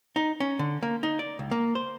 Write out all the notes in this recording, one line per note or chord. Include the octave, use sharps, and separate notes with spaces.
D#4
C#4
D3
A#3
D#4
D5
C#2
A#3
C5